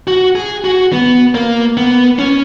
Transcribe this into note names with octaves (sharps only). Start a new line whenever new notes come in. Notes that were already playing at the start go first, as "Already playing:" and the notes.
F#4
G#4
F#4
B3
A#3
B3
C#4